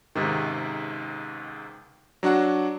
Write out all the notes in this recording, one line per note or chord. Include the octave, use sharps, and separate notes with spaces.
C#2 G#2 C3 D#3
F#3 D4 F#4 F#5